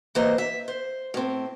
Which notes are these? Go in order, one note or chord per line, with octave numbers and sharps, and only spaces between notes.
E3 A#3 C5 D#5
E5
C5
A2 C4